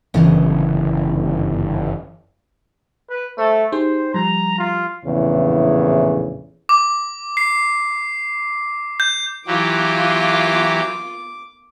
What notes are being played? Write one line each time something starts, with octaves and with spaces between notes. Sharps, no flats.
G1 F#2 C#3 E3
B4
A3 C5
D#4 G4 G#4 C5
F3 G3 A#5
F4
A#1 E2 A2 C#3
D6
C7
G6
E3 F#3 F4 G4 D6